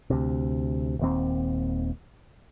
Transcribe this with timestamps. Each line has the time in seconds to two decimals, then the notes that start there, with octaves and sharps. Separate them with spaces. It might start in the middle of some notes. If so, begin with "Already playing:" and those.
0.10 D2 C3
0.99 D#1 D#2 C4